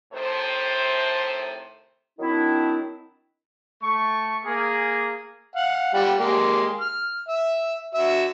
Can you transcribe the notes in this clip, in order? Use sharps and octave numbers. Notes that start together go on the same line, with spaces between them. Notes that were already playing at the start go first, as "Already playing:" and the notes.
A2 C3 D#3 A3 C5
D#3 F#3 C4 D4 E4
A3 C#6
A#3 G#4
F5 F#5
G3 F#5 G5
G#3 A#3 G4
F6
E5
F#4 E5